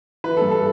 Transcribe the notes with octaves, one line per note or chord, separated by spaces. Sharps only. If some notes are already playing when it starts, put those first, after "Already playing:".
E3 B4
G2 A4
A4